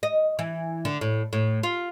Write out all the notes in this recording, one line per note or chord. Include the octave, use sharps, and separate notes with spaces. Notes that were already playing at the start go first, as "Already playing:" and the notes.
D#5
E3
D3
A2
A2
F4